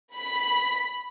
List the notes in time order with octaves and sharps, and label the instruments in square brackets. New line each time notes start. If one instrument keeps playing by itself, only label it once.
[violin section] B5